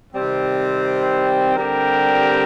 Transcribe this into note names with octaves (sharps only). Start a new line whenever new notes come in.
C3 D#3 G3 C4
D3 G3 C4 G4 A#4